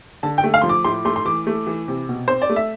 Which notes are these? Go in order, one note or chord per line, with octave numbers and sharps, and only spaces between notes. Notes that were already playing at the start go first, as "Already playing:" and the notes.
D3 A5
G5
A3
F5
F3 C6
D6
A2 C6
A3 C6
C6
E3 D6
A3
E3
C3
B2
C4 C5
D5
A3
E5